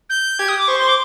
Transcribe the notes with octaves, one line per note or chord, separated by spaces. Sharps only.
G6
G4 G#6
D#6
D6
C5 C#6
C6
D6